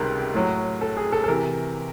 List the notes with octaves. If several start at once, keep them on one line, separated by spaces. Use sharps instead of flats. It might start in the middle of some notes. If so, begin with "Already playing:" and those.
Already playing: C#2 C3 D#3 G3 A#4 B4
A2 F#3
A4
G#4
A4
A4
C3 E3 A#4